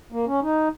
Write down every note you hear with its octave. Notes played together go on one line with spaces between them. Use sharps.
A#3
C#4
D#4